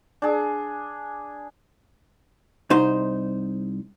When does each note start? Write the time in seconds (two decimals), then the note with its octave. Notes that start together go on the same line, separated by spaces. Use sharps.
0.22 D4 G#4
2.70 C2 D#4 C5